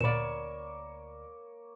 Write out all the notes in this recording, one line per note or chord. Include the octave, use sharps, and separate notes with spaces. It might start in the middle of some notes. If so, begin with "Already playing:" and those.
D2 A#2 A#3 C#5 D5 B5 E7